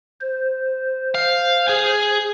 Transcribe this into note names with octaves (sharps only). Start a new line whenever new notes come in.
C5
F5
G#4 G#5